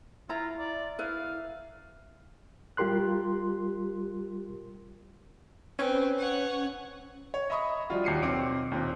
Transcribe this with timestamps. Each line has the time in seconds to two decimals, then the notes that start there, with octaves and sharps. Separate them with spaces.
0.29 E4 F4 A#5
0.59 D5
0.99 E4 B4 F5
2.77 G3 F4 G4 A#4 C6 F#6
5.79 C4 C#4 B4
6.18 C#5 F#5
7.34 C#5
7.50 D#5 E5 A#5 B5 C#6 D#6
7.90 F3 G3 D4 F4 F#4
8.04 D#2 C7 C#7 D#7
8.22 B1 C4 D6 D7
8.71 D#2 A#2 C4